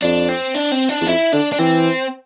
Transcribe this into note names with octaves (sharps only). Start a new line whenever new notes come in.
F2 D4
C4
D4
C4
D4
E2
F2 E4
D3 D4
D4
E3 C4